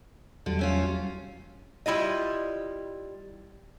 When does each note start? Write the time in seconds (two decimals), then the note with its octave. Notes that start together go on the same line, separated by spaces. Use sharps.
0.46 E2 D3 F#3 G3
0.59 A3 C#4 F4
1.86 G3 E4 F4 D#5